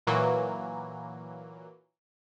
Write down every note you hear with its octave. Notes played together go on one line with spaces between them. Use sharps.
A#2 E3 F#3 A#3